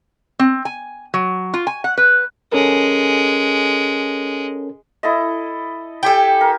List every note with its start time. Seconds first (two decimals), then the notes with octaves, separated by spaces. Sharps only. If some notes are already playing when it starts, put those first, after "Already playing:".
0.39 C4
0.65 G#5
1.14 F#3
1.54 F4
1.67 G#5
1.84 F#5
1.98 B4
2.52 G#3 C#4 A4 A#4
5.03 E4 A4 D#5
6.03 G4 A4 G5 G#5
6.41 A#4